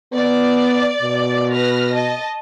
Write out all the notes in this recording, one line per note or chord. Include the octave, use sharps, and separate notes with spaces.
B3 D5
B2
B4 F6 A#6
D#5 A5